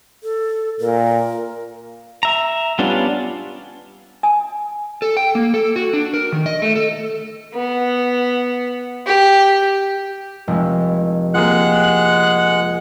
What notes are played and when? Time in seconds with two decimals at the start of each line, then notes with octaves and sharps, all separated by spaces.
0.23 A4
0.80 A#2 A#4
2.23 E5 A#5
2.79 G3 B3 C#4 D4 F4
4.23 G#5
5.02 A4
5.17 G5
5.35 A#3
5.54 A4
5.76 F#4
5.93 D4
6.14 A#4
6.32 D#3
6.46 D#5
6.62 A3
6.75 A4
7.54 B3
9.06 G4
10.48 F1 G#3
11.34 G#3 A#3 C4 F4 F#5 F#6